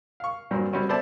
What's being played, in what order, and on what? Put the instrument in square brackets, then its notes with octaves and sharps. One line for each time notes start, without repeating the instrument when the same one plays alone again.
[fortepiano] F5 C#6
G2 A#2 F#3 C4
G3 C4 C#4 F#4
B3 A4 C5 D5 E5 A5